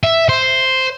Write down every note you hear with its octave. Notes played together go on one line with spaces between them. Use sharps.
E5
C5